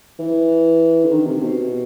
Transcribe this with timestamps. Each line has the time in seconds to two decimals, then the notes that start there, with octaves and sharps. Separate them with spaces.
0.19 E3
1.04 D3
1.10 D#3
1.26 C3
1.42 B2